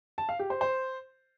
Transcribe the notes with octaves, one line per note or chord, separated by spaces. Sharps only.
A5
F5
G4
C5
C5